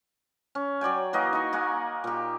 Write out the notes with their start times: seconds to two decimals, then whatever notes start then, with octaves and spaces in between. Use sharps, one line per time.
0.55 C#4
0.81 F#3 D5 G5 G#5
1.13 E3 A#3 F#4 D#5
1.33 D#4 C#6
1.53 A#3 F#5 G#5
2.04 A#2 G4